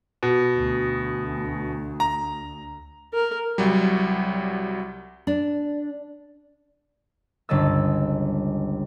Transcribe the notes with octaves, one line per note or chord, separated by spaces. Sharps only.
B2
D2
A#5
A#4
C2 F#3 G3
D4
G1 C#2 G#4 D#5 A5 E6